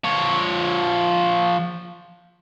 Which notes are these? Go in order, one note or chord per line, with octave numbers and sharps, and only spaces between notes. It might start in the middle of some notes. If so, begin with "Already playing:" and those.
F3 C#5